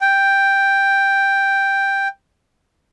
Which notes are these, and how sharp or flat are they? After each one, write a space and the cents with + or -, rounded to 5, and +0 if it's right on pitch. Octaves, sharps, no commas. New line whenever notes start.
G5 +5